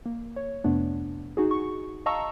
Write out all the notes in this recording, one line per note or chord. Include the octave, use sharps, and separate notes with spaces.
A#3
C#5
F2 C3 A3 B3 D4
D#4 F#4 G#4
C#6
D#5 F5 A5 A#5 C#6 E6